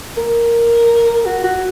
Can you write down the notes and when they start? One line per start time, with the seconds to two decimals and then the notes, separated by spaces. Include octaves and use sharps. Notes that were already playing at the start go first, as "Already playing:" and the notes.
0.17 A#4
1.25 F#4
1.44 F#4